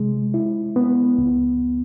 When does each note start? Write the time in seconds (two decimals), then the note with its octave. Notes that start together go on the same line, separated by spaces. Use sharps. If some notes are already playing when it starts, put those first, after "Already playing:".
Already playing: C3 G#3
0.34 E4
0.76 B3
1.18 C#2